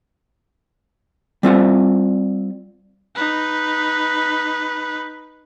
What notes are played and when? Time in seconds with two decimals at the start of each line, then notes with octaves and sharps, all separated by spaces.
1.43 G3 C4 F4 F#5
3.16 D#4 B4